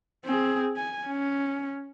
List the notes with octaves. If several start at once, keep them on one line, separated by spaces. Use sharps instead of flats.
C4 G#4
G#5
C#4